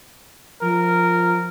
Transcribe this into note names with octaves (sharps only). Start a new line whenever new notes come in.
F3 A#4